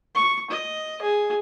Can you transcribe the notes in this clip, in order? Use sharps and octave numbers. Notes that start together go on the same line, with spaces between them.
C#6
D#5
G#4